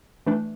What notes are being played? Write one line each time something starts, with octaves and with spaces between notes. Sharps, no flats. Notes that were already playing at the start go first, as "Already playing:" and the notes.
E3 A3 D4